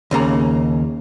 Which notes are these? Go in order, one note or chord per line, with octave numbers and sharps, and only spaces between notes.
D#2 C#3 A#3 A#5